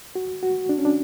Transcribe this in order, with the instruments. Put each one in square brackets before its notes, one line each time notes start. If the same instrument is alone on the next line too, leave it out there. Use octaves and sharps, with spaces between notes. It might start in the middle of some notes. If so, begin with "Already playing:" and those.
[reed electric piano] F#4
F#4
D4
C#4
D4